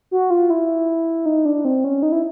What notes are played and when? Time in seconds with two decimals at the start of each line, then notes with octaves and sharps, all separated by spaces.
0.11 F#4
0.30 F4
0.50 E4
1.26 D#4
1.45 D4
1.65 C4
1.84 C#4
2.03 D#4
2.12 E4